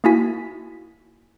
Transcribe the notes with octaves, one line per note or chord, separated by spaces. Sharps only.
A#3 D#4 E4 F#4 G#5 B6